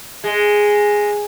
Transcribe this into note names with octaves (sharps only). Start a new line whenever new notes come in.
G#3